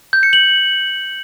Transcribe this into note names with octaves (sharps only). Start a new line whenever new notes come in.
G6
C#7
F#7